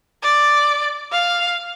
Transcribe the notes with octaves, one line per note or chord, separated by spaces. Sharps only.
D5
F5